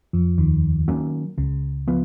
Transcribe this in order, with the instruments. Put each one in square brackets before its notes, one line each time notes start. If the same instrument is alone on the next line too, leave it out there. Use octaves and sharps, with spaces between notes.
[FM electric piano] F2 F3
D#2 D#3
[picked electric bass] D#3 F#3 A#3 C#4
[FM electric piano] C#2 C#3
[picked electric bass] F3 B3